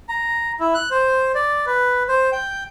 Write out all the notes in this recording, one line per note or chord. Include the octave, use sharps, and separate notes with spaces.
A#5
E4
F#6
C5
D5
B4
C5
G5